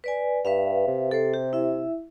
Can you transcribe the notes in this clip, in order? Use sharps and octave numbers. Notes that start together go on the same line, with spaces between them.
B4 D5 G#5
G2 B4 E5 F5
C3
A4 C5
G4
E4 E5